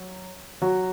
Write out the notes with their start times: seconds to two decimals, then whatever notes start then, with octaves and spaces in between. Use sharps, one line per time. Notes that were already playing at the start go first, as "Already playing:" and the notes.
Already playing: F#3
0.62 F#3 F#4